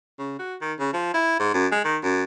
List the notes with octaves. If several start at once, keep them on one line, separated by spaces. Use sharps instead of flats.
C#3
F#4
D#3
C#3
F3
E4
G#2
F#2
G#3
D#3
F#2